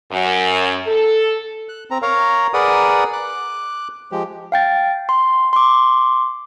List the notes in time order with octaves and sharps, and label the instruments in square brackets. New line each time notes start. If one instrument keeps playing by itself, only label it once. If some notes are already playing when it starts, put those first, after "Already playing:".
[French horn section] F#2
A4
[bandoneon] F#6
C4 A#5
A#4 C#5 F5 A#5
G#4 A#4 B4 D5 F#5 D#6
D6 F#6
F3 G#3 G4
[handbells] F5 G5 A6
C6
C6 D6